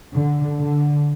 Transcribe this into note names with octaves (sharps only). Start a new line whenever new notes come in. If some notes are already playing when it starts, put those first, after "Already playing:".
D3
D3